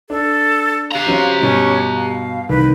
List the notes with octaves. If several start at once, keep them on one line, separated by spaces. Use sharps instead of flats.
D4 A4
G4 F5 A#5
F#3 C#4 C5
G2 B2 C#4
F5
C2 D#3 B4